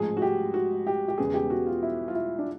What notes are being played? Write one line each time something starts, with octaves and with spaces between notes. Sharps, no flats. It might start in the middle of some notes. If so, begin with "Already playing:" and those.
Already playing: A1 G#2 F3 G#4
F#4
G4
F#4
G4
G4
E1 E2 C#3 G#4
G4
F#4
F4
E4
F4
E4
D4